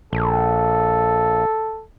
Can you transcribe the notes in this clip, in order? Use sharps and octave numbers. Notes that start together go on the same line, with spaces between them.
A#1 A4